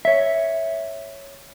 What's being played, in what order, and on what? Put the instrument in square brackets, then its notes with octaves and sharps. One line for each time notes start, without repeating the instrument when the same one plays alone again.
[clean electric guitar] C#5 E5